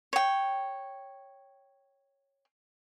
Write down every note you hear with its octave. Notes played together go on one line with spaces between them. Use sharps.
C#5 G5